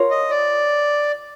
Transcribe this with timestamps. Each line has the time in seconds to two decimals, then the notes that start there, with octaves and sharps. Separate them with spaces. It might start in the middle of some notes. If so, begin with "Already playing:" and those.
Already playing: F4 A#4 C#5
0.11 D#5
0.30 D5